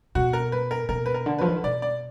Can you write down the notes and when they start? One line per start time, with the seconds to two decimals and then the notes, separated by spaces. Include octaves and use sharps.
0.15 B2 F#4
0.33 A#4
0.52 B4
0.71 A#4
0.89 B2 A#4
1.06 B4
1.14 A#4
1.26 D3
1.39 F3 B4
1.48 D#3
1.57 D3
1.64 B2 D5
1.82 D5